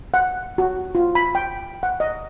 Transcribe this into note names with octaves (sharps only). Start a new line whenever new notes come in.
F#5
F#4
F4
B5
G5
F#5
D#5